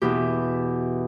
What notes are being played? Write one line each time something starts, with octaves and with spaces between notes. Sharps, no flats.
E2 B2 B3 E4 G4